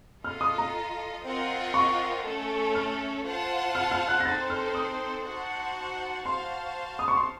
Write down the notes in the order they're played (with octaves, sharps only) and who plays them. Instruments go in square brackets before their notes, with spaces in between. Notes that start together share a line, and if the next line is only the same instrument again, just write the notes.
[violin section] F4 A4 D#5 [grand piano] F6
[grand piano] D#6
A#5
[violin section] C4 F4 A#4 D#5 F#5
[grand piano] C#6
[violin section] A3 C#4 A4
[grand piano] F6
[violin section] F4 C5 F#5 A5
[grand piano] F6
F6
F#6
A#6
[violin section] C4 D#4 A4 C5 [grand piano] A6
[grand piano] F6
D#6
[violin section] D#4 F#4 C5 F#5 A5
[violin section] F#4 C5 F5 A5 [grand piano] C6
[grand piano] D#6
C#6
C6